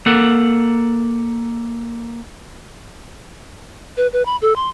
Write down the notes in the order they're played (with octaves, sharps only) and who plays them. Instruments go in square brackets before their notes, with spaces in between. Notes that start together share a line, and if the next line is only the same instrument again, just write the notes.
[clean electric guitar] A#3 A4 F#5
[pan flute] B4
B4
B5
A4
C6